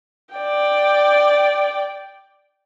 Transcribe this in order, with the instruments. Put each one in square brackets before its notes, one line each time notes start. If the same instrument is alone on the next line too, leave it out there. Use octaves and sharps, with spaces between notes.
[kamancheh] D5 G5